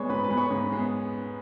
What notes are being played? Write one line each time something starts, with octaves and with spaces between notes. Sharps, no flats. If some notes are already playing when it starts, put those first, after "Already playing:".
Already playing: G#3 B3 C#5 D5 C#6
G#2 B4 B5
B4 B5
G#3 B3
C#5 C#6
G#2
G#3 B3